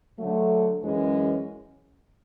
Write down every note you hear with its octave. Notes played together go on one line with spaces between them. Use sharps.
D3 F#3 A3
F#2 E3 G#3 C#4